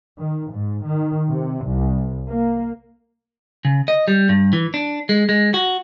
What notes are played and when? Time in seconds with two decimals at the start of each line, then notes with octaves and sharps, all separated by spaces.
0.18 D#3
0.52 G#2
0.85 D#3
1.29 C3
1.65 C2
2.28 A#3
3.65 C#3
3.88 D#5
4.08 G3
4.29 G2
4.53 E3
4.74 D4
5.09 G#3
5.29 G#3
5.54 F#4